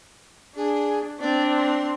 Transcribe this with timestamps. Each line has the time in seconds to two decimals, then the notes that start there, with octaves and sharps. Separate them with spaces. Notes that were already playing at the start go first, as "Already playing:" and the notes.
0.56 D4 G#4
1.20 C4 D4 D5
1.57 C6